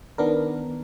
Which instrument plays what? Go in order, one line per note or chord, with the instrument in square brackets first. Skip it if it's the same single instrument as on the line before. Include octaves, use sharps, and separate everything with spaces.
[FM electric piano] D#3 B3 D4 A#4